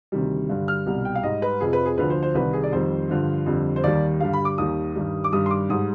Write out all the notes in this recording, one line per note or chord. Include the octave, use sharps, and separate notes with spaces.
D2 C3 D#3 G3
G2 D3 G3
F6
C2 B2 G3
G5
F5
G#2 G3 D#5
B4
F2 C3 F3 G#4
B4
G#4
D2 D3 F3 B4
C5
C5
C2 C3 D#3 G3 B4
G#4
D5
F2 D#3 G3 C5
G2 D3 F3
F2 D3 G3
C5
D#2 D#3 G3 D5
G2 D3 G3 F5
B5
D6
D#2 D#3 G3 D#6
G2 D#3 G3
D6
G2 D#3 G3 D#6
C6
D6
G#2 G3 D#6